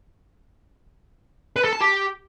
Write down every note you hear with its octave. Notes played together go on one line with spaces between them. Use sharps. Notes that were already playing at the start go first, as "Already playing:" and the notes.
B4
A4
A5
G4